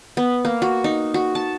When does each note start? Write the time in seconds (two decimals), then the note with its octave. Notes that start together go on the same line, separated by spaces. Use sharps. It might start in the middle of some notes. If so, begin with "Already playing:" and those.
0.17 B3
0.45 A#3
0.62 F#4
0.84 D#4
1.14 F#4
1.35 A5